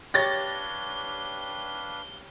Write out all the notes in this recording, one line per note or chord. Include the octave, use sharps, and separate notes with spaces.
D4 G4 B4 C#5 F5 A6 A#6 G7